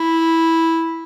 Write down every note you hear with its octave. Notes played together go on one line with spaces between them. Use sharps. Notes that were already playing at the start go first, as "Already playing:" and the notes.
Already playing: E4